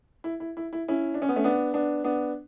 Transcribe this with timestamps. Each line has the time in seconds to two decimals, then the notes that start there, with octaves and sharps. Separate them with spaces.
0.24 E4
0.40 E4
0.57 E4
0.73 E4
0.88 C#4 E4
1.14 D4
1.22 C#4
1.29 B3
1.36 A3 C#4
1.44 B3 D4
1.74 B3 D4
2.04 B3 D4